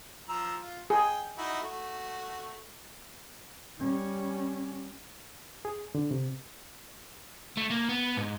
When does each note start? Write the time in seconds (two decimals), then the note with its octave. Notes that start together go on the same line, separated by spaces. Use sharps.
0.29 F3 A#5 E6
0.60 F4
0.90 G#4 G5
1.38 D#4 E4 F#4
1.62 A3 F#4
3.79 G3 C#4
5.65 G#4
5.95 D3
6.11 C3
7.57 A3
7.70 A#3
7.89 B3
8.17 G#2